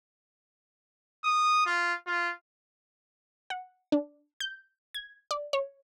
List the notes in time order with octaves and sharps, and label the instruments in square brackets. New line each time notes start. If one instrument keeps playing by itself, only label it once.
[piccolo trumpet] D#6
F4
F4
[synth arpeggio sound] F#5
D4
G6
G#6
D5
C#5